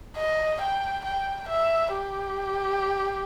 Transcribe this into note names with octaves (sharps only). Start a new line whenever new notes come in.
D#5
G5
G5
E5
G4